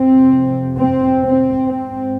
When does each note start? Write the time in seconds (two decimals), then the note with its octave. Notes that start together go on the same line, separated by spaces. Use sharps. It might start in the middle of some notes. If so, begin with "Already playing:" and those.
Already playing: F2 C3 C4
0.79 C4
1.23 C4
1.68 G#2 C4